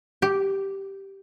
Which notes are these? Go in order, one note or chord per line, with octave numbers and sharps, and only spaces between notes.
G4